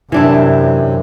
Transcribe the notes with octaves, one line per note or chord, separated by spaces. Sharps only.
F#2 C3 E3 D4 E4